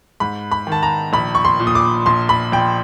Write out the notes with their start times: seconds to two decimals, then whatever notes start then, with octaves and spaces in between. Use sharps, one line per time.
0.20 G#2 B5
0.51 B5
0.67 D#3 A5
0.83 A#5
1.13 A#1 B5
1.35 C#6
1.45 C6
1.60 A#2
1.67 D#6
1.75 D6
2.06 A#1 C6
2.29 B5
2.52 A#1 G5